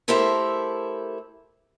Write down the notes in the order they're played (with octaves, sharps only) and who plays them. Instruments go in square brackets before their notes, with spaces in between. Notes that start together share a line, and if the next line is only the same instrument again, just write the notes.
[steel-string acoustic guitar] A3 E4 G4 A4 A#4 C5